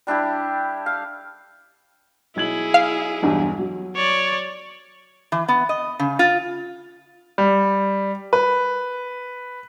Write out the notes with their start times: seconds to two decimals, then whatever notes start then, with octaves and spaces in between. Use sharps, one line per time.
0.07 G3 D4 E4 G4
0.86 F5
2.36 B1 E4 G#4 G#6 F#7
2.74 F5
3.22 B1 E2 G2
3.59 F#3
3.96 C#5 D5
5.32 E3
5.48 B3
5.69 D#5
5.99 C#3
6.19 F4
7.38 G3
8.33 B4